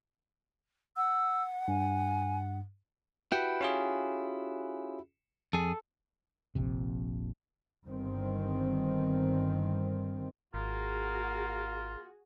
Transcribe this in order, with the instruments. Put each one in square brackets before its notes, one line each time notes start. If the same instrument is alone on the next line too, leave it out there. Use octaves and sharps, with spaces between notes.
[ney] F#5 [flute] E6
[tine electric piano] G2 [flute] G#5
[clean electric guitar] E4 F#4 G4 [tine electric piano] B4 F#5 G5
[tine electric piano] C#4 F4 G#4
[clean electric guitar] F2 G#4 [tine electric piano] A4
[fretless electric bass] F1 A#1 F2 C3
[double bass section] G1 G2 D#3 C4
[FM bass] G#1 [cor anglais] A#3 [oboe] F4 [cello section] F#4 G#4